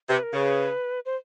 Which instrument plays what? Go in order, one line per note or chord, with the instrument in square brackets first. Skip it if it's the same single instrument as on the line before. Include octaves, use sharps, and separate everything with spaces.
[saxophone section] C3 [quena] B4
[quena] A#4
[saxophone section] C#3 [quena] B4
[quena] C5